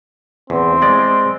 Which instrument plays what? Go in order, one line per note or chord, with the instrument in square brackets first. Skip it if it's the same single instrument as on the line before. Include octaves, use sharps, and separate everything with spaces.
[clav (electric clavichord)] E2 [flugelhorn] C4
[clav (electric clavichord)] G#3 D5